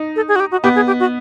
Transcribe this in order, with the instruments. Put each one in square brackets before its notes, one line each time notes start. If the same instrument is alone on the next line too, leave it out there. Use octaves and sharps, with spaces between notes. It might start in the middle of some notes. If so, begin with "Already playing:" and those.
Already playing: [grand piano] D#4
[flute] A4
G#4
F#4
G4
F#4
[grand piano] B3 [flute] G4
[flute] G#4
G4
F#4